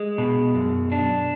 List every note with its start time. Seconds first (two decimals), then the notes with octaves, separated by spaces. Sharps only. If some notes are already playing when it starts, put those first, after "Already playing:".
Already playing: G#3
0.18 B2
0.55 F#2
0.92 D4